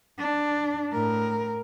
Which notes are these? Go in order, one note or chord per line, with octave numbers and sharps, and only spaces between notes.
D4
A2 A#4